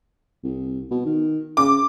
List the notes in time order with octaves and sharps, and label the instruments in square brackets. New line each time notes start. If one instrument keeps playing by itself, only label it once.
[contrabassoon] C2
B2
D#3
[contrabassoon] C#3 [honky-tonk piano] D6